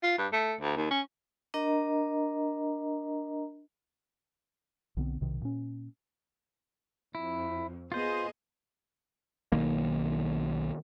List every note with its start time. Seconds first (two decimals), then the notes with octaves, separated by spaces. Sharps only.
0.03 F4
0.18 G2
0.33 A3
0.60 D2
0.76 D#2
0.91 C#4
1.54 D4 A#4 D#5 A#5
4.97 B1 D3 B3 C4
5.21 B1 C3 D#3
5.41 A#2 C#4
7.15 F2 E4
7.92 B3 F4 G#4 C5 D#5
9.52 B1 D#3 A#3